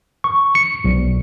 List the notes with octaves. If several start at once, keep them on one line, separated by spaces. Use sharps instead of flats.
C#6
C#7
B1